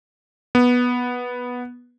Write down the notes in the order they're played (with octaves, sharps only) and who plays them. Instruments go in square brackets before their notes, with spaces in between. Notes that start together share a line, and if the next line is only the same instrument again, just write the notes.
[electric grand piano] B3